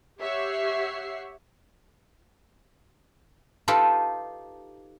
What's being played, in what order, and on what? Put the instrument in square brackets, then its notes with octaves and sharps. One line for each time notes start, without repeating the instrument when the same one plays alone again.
[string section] G4 C#5 E5 F#5 C7
[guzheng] D#4 F4 G4 A4 B4